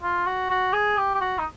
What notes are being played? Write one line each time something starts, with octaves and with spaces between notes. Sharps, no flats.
F4
F#4
F#4
G#4
G4
G4
F#4
D#4